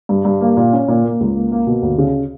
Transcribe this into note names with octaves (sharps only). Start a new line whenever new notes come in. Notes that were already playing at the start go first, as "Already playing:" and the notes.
G2
G2
A#3
A#2
C#4
A#2
A#3
C#2
A#3
A#3
B2
D2
C#3